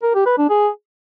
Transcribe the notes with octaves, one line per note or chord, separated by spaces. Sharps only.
A#4
G4
B4
D4
G#4